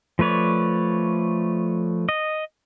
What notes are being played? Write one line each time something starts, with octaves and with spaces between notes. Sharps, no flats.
F3 A3 B4 C#5 D5
D#5